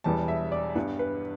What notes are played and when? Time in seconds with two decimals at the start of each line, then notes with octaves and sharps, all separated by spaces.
0.04 E1 E2 E3 G3 B3 A5
0.28 E5
0.52 D5
0.75 G2 G3 B3 B4
0.99 B4